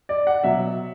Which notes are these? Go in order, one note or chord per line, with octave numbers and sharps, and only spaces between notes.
D5
F#5
B2 F#3 E5